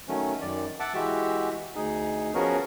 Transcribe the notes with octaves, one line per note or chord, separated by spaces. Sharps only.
D#3 F#3 A3 C#4
F#2 D#3 D5
E5 F#5 A5 D6
E3 G#3 F#4 G4 E5
D2 D#4 G#4
F3 B3 C#4 F#4 G#4 A#4